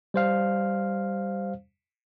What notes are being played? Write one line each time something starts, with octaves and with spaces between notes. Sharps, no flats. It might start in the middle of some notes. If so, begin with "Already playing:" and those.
G3 C5 F5